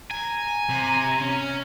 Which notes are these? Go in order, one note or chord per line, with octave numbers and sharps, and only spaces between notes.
G#5 A#5
C3
C#4